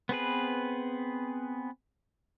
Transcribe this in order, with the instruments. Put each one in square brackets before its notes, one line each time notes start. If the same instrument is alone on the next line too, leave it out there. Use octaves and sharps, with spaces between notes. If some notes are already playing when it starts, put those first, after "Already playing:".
[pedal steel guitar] B3 C4 G#4 B4